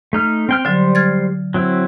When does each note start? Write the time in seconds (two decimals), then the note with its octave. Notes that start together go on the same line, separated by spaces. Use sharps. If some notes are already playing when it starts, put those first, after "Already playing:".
0.13 A3 D#4 F6
0.49 C4 G5 F6
0.65 D3 F#3 G3 C5
0.95 F6 G#6 A6
1.54 F#3 C4 E4